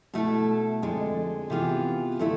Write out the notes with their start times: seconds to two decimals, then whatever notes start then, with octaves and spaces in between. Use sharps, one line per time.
0.13 B2 A3 E4 A4
0.82 F2 D3 G#3
1.50 C3 E3 B3 F4 G#4
2.19 D3 A3 E4